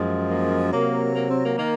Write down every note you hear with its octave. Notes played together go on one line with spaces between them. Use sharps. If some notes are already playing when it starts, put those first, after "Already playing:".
Already playing: F#2 F3 G#3
A#3
C3 F#3 A#3
A#3
C4
A#3
D#3 A#3